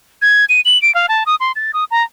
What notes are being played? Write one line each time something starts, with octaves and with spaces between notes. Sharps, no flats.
G#6
D#7
F#7
D7
F5
A5
D#6
C6
A6
D#6
A#5